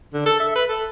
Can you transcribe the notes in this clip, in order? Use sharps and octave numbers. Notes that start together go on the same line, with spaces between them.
D3
A4
E5
B4
A4